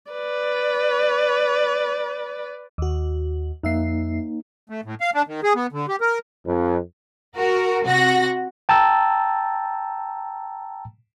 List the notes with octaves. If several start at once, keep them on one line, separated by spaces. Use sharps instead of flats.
B4 D5
D#2 F#4
F2 A#3 D#4 E5 C7
A3
A2
F5
D4
D#3
G#4
B3
D3
G4
A#4
F2
F#4 A#4
C3 F#4 A#6
G5 A5 A#5 E6 A6